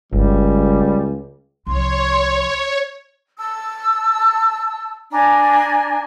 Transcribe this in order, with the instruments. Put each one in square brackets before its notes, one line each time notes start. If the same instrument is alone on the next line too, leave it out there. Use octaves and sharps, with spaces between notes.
[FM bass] G1 [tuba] C#2 [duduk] G3
[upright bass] C2 F3 [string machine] C#5 [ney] C6
[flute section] A5 E6
D4 G#5 A#5